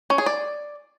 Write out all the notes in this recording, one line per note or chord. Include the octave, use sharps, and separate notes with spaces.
C#4
G#4
D5